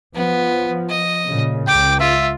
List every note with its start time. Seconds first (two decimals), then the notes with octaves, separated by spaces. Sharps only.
0.14 F3 B3
0.89 D#5
1.26 A#2 C#3
1.68 C#2 G5 D6
2.00 F4 E5